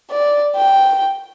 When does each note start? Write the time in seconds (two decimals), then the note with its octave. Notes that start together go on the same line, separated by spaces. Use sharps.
0.11 D5
0.57 G5